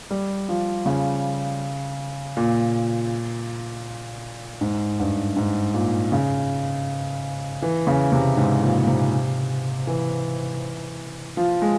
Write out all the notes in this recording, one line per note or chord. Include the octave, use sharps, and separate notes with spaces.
G3
F3
C#3
A#2
G#2
G2
G#2
A#2
C#3
E3
C#3
C3
G#2
A#2
C3
E3
F3
G#3